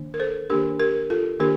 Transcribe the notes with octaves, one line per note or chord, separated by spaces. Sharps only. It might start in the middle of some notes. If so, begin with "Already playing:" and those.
Already playing: D#3 A#3 D4
A#4
A4 C5
D#3 A#3 D4 G4 A#4
G4 A#4
F4 A4
D#3 A#3 D4 G4 A#4